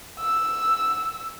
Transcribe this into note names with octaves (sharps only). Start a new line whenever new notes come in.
E6